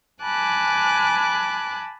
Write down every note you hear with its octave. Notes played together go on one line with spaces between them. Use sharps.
G#5 A5 B5 D6 F#6